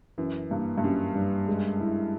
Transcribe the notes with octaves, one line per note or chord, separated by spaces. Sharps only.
F#2 E3
G2 A#3
G2
F#2 G3
G2
G#3
E4